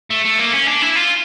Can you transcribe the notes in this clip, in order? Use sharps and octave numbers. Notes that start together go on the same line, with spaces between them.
A3
A3
A#3
C#4
D4
E4
F4